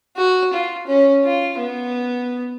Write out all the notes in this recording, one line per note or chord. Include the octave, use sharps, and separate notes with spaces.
F#4
F4
C#4
F4
B3